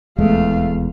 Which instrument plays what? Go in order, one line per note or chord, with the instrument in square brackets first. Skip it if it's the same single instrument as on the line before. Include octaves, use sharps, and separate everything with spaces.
[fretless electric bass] D#1 E2 G#3 [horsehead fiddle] A3 F5